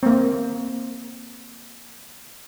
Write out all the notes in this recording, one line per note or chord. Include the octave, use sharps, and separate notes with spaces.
A#3 C4